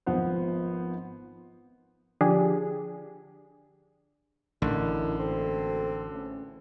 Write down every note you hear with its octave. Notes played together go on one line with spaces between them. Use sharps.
G#1 F3 B3 C5
D3 F3 D4 G4 G#4
A1 F#2 D3 D#3 E4
A#3 C4 F#4 A4
E2 A3 C#4